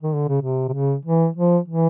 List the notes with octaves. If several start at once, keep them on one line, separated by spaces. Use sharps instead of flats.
D#3
D3
C#3
C3
C3
C#3
E3
F3
E3